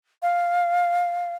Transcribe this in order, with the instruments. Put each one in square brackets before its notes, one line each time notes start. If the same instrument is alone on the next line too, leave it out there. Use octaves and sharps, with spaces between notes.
[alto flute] F5